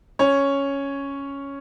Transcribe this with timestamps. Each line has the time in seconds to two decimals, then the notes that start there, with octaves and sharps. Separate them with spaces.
0.19 C#4 C#5